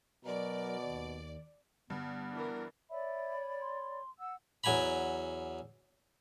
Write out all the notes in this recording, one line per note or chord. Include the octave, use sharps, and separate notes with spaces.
B2 F#3 A#4 D5
D#2
G2 D3 G3 B3
E3 D4 A#4
C#5 D5 E5 B5
C6
F#5 E6
E2 F#3 G#5 A#5 B5